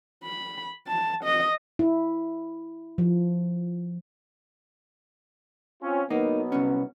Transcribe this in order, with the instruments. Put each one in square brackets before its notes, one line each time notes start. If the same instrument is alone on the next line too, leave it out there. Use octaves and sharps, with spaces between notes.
[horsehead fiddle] B5
A5
D#5
[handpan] E4
F3
[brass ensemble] C4 C#4 F4
[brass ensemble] B2 F#3 B3 [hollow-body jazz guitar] A#3 D#4
[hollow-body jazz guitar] C2 C#4